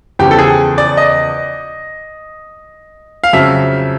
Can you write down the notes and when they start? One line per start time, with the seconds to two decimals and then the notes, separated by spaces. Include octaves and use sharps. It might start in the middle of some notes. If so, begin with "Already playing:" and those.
0.19 E2 C#3 F3 G4
0.31 A4
0.39 G#4
0.78 D5
0.97 D#5
3.24 F5
3.33 F2 C#3 F#3 E5